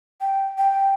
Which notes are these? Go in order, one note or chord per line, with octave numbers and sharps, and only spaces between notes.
G5
G5